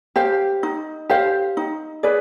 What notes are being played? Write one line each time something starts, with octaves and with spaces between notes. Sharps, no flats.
G4 C5 F5
D#4
G4 C5 F5
D#4
G#4 B4 D5